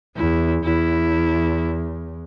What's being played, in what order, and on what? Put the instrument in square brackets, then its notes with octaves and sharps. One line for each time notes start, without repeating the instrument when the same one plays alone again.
[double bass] E2 [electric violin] E4
[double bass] E2 [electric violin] E4